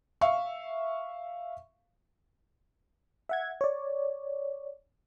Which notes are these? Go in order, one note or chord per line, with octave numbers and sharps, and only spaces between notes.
E5 F5 C#6
E5 F#5 G#6
C#5 D5